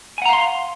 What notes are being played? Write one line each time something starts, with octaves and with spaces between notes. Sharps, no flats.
F5 F#5 G#5 A#5 C6